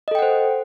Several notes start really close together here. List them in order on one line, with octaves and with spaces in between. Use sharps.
D#5 A4 G5 F#5 C5